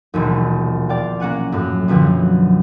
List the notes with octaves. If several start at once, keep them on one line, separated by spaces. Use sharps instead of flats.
E1 A#1 D#2
D5 F5 G5
A#3 C#4 F#5 G#5
F#2 A2
B1 F#2 D3 F3 F#3